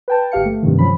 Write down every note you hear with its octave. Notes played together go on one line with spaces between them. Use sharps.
B4 G5 A5
G1 G4 F5 C#7
A3
G2 C3 D#3
F3 C#4 B5